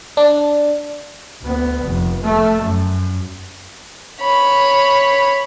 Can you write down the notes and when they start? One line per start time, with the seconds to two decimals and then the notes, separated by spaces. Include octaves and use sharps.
0.17 D4
1.42 D2 B3
1.84 F1
2.24 A3
2.62 F#2
4.21 C#5 B5